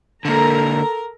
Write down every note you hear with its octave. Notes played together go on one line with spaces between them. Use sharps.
D3 A#3 A4 A#4 A#5